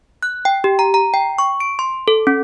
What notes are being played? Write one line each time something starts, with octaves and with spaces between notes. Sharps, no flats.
F#6
G5
G4
A#5
A#5
G5
C#6
D7
C6
A4
C#4